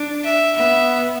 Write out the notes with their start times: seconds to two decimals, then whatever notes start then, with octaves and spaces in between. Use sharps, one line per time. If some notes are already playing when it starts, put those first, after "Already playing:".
Already playing: D4
0.24 E5
0.56 B3 E5